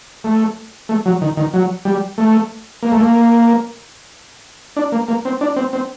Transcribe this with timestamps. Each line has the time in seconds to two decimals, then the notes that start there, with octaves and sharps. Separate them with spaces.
0.24 A3
0.89 A3
1.06 F#3
1.21 D#3
1.37 D#3
1.54 F#3
1.85 G3
2.18 A3
2.83 A#3
2.92 A3
3.00 A#3
4.76 D4
4.92 A#3
5.08 A#3
5.25 C4
5.41 D4
5.56 C4
5.73 C4